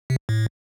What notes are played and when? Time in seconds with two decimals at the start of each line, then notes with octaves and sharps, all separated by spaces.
0.10 C3
0.29 A2